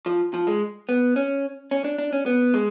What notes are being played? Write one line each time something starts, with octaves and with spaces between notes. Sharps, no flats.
F3
F3
G#3
B3
C#4
C#4
D4
D4
C#4
B3
G#3